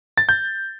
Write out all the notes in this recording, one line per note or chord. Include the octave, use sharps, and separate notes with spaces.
A6
G6